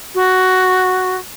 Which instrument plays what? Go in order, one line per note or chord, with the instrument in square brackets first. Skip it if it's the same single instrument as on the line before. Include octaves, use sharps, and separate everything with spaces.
[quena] F#4